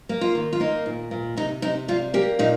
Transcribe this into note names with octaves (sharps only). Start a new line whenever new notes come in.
A#3
F4
D#3
F4
A#3 D#4
A#2
A#2
C3 D#4
C3 D#4
G3 F4
A#3 G4
A#2 D#4